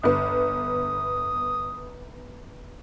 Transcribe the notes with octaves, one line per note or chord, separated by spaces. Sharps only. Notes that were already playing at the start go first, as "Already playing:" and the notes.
G1 B3 D#6